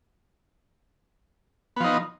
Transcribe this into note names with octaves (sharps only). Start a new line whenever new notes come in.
F3 B3 D#4